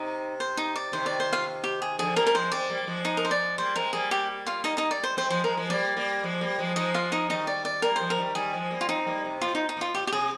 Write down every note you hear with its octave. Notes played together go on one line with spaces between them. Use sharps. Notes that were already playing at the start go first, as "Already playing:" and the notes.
Already playing: C3 D#4
C5
D#4 D#5
D5
C3 D#3 C5
D5
C5
F4 F5
G4
G#4
D3 F3 G#4
G3 A#3 A#4
A#4
F3 G#3 C5
G#3 C4 D5
G3 A#3
G3
F3 G#3
D#4 D#5
A#4
C5
D5
G3 A#3 C5
G#3 C4 A#4
G3 A#3 G#4
G4
F4 F5
D#4 D#5
D#4 D#5
D5
C5
G#3 C4 C5
F3 G#3 C5
F3 G#3 A#4
F3 G#3
G3 A#3 D5
G3 A#3
F3 G#3
G3 A#3
F3 G#3
F3 G#3 D#4 D#5
F4 F5
D#4 D#5
D#3 G3 D#4 D#5
D5
D5
G3 A#3 A#4
F3 G#3 C5
A#4
D#3 G3
D#3 G3 G#4
F3 G#3
G3 A#3
F4
G#3 C4 D#4
G3 A#3
C3
A#2 F4
D#4
D#4
A#2 F4
A#2 G4
G4
C3 G#4